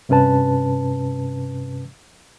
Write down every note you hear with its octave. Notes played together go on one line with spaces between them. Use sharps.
G2 C3 C#4 B4 A5